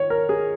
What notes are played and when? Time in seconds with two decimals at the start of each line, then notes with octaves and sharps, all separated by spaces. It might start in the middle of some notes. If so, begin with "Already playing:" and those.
Already playing: D#3 C#5
0.10 A#4
0.29 G#4